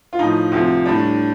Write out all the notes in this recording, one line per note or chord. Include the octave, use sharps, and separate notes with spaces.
F4
A2 F3 D#4
D2 C3 F3
A2 G3 D4